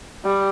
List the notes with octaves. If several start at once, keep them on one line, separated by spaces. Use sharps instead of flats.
G3